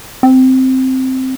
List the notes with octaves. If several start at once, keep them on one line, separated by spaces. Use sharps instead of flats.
C4